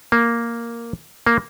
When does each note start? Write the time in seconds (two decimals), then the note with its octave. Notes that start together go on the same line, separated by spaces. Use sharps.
0.12 A#3
1.27 A#3